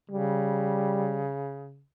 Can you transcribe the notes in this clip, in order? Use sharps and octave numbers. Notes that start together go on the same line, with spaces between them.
C#3 G3